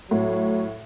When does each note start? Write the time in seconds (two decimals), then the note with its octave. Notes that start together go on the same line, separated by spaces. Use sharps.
0.11 A2 F#3